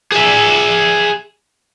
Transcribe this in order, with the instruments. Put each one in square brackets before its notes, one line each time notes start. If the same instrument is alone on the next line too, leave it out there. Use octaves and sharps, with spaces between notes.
[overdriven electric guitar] G#4 E5